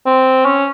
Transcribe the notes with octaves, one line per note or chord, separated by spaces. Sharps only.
C4
C#4